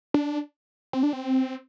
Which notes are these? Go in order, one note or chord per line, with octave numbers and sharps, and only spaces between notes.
D4
C4
D4
C4